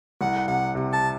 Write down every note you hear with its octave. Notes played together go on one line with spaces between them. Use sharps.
C2 F#5
C3 F#5
C3
A5